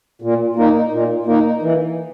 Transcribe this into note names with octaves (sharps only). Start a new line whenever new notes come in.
A#2
A#3 D#4
A#2
A#3 D#4
E3